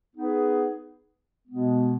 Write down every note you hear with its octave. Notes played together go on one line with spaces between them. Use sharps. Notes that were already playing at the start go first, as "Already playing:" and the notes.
B3 D#4 G#4 B4
B2 G#3 B3